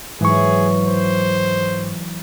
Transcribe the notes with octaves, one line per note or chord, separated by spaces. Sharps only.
G#2 E3 F#3 G#4 C#6
C5